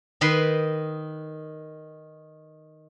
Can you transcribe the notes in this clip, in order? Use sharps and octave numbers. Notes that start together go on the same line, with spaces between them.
D#3 B4 D#5 B5 C6